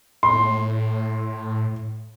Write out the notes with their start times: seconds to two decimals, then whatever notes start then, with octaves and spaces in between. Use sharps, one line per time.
0.23 A2 C6